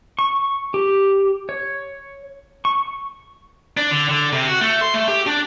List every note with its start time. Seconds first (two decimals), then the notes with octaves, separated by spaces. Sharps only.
0.19 C#6
0.74 G4
1.49 C#5
2.65 C#6
3.77 D4
3.91 D3
4.09 D3
4.33 C3
4.48 F#4
4.61 A3
4.81 C6
4.94 A3
5.08 G4
5.27 D4